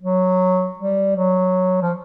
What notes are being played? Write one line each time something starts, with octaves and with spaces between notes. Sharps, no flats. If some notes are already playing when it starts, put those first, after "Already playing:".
F#3
G3
F#3
F3